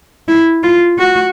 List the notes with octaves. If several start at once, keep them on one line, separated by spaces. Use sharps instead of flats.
E4
F4
F#4